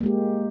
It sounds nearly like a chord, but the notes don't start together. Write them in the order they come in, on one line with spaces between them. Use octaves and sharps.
A#3 G#3 G4